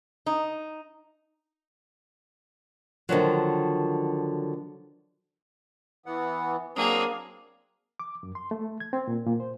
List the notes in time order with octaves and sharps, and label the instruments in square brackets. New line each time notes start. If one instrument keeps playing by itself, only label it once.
[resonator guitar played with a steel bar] D#4
[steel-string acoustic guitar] D3 D#3 F3 F#3
[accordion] E3 B3 [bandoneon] F#5
[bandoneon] F#3 C4 D4 [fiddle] A#3 G#4 [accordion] D#6
[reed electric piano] D6
F#2
C6
A3
G#6
C4
A#2
A#2
C5